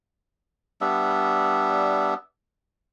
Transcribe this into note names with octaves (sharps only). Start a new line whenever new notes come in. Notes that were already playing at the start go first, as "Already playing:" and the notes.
G3 B3 D4 E5